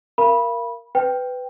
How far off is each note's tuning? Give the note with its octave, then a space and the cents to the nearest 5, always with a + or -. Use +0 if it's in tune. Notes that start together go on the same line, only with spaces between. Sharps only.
A#4 +0 F5 -35 B5 -20
B4 +15 G5 +0